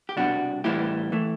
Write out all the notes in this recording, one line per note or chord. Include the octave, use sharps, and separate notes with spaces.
G4
C2 B2 G3 D4 F#4
A2 E3 G3 E4 G4
E3 A3